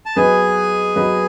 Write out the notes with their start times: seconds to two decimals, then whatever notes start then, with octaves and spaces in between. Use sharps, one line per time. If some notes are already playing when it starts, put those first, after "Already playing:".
0.06 A5
0.16 F#3 B3 F#4 G#4 B4 D#5 G#5
0.96 F#3 B3 F#4 B4 D#5